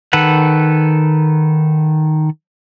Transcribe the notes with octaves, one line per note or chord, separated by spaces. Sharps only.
D#3 A4 B4 F#5